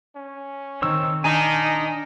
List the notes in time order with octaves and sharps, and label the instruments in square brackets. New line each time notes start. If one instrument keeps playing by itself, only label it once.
[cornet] C#4
[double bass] D#3 [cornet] C4 [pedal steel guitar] C#5 E6
[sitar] D#3 D#4 [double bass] D4 [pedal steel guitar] G#5 [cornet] A#5